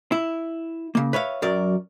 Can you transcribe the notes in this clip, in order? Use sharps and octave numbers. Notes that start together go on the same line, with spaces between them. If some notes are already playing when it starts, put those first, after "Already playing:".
E4
C#3 A#3
B4 C#5 E5 F5
F#2 F#3 A#4 D5